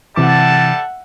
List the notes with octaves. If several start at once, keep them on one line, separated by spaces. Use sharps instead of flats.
C3 E3 G3 A4 E5 F#5 A5 D6